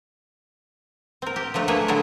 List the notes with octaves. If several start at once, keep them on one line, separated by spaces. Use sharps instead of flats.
C4 A#4
G4
F3 F#3 A3 D4
A3 A#3 G#4 B4 E5
A#2 D3 F#3 G#3 E4 A4